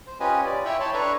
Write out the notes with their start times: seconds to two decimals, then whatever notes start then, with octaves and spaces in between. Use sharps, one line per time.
0.07 C5
0.20 C#4 F4 G4 B4 D#5 G#5
0.45 D5
0.65 E4 C#5 E5 G5 B5 C#6
0.80 C#5 A5 B5 C6
0.94 D4 A4 B4 C#5 A#5 C#6